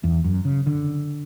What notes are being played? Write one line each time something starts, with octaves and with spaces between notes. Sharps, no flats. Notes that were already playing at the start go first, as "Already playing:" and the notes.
E2
F#2
C#3
D3